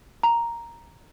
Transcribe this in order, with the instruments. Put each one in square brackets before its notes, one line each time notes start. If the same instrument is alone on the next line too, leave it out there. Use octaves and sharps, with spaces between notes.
[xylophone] A#5